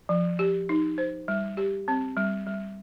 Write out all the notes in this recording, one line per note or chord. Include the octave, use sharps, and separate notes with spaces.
F3
G4
D#4
C5
G3
G4
C4
G3
G3